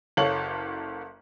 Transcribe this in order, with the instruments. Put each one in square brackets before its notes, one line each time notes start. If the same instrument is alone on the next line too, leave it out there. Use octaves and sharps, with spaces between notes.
[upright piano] F#1 A4 C#5 F5 F#7